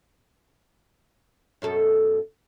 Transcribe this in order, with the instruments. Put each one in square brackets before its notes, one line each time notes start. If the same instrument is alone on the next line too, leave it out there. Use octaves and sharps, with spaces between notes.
[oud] F#2 B2 A4